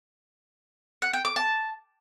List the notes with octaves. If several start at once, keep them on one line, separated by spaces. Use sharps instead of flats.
F#5
G5
D6
A5